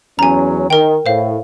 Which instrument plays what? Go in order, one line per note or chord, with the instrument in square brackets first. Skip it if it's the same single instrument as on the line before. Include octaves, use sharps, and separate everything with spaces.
[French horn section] E2 F#3 C#4 [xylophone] G#5 A#5
[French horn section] D#3 [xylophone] A#4 G5
[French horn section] A2 [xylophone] C5 F5